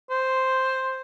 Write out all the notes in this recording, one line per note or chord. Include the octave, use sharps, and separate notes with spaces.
C5